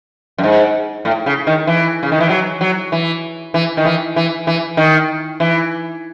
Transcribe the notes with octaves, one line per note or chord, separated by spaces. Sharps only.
F#2
G#2
A2
C#3
D#3
E3
C#3
D#3
E3
F#3
F#3
E3
E3
D#3
E3
E3
E3
D#3
E3